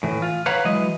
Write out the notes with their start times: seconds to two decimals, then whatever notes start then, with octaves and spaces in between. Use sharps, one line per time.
0.03 A2 E3
0.22 F4
0.46 B4 C#5 F5 F#5 A#5 B5
0.65 E3 F#3 G#3 D#5